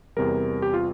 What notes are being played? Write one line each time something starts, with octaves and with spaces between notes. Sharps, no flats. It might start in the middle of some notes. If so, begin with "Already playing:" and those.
E2 C3 G3 A#4
G4
F4